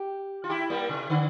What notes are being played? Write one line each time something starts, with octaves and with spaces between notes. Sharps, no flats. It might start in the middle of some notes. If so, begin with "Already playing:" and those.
Already playing: G4
F4
E4 G4
G3 A#3
C3
D3